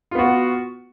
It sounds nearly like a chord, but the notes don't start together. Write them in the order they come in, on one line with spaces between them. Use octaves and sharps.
F4 B3 F#4